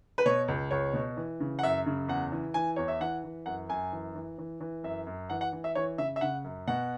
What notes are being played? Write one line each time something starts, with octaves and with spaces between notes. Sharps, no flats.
B4
B2 C#5
C#2
C#2 C#5
B2
E3
C#3
F#5
F#2 E5
C#3
E2 F#5
E3
E3 G#5
E2 C#5
E5
E3 F#5
E3
F#2 F#5
F#2 G#5
E3
E3
E3
E3
F#2 E5
F#2
E3 F#5
F#5
E3
E5
E3 C#5
C#3 E5
E5
C#3 F#5
F#2
B2 F#5